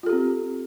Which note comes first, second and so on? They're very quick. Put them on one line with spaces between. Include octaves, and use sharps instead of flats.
F4 A4 G4 C4